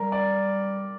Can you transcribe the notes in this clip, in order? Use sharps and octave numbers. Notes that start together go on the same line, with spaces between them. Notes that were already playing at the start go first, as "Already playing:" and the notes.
Already playing: G3 A#4
D5